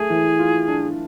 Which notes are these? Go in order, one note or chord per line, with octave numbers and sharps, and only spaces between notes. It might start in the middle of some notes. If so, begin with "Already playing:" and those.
Already playing: A3 G#4
E3
F4
D4